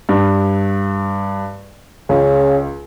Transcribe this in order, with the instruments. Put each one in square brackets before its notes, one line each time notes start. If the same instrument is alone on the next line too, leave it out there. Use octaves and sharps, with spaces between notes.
[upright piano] G2
[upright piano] C#2 [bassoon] C#3